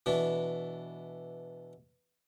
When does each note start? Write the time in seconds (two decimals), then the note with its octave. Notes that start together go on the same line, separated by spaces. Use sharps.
0.06 B2 E3 D4